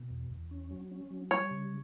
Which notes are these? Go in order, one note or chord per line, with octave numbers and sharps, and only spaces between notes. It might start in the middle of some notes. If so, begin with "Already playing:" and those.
Already playing: B2
E2
E2
C#4
F#3
C#4
F#3
G3 C#5
C#3